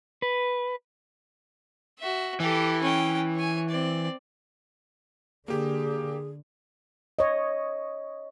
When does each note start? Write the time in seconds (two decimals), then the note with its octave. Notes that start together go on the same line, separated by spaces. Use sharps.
0.22 B4
1.99 F#4 E5
2.40 E3 G4 A4
2.82 C#4 G5
3.35 C#5 G#5
3.69 C4 D5
5.48 D3 A#3 G4 G#4
7.19 C#5 D#5